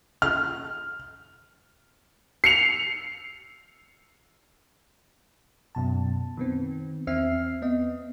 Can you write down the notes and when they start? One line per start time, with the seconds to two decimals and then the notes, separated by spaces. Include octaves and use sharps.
0.22 F6
2.44 C7 C#7 F7
5.75 F#2 B2 A5
6.37 D#3 B3 C4
7.07 E2 C4 E5 F6 C7
7.62 B3 D#5